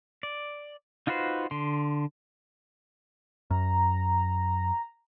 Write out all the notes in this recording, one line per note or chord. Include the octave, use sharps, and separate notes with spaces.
D5
D#4 F4 F#4 B4 C5
D3 C6
F#2 A#5